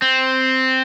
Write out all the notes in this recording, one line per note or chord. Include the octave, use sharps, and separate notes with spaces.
C4